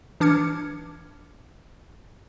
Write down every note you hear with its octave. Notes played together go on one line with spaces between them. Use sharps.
E3 D4 D6 F6 G#6 C#7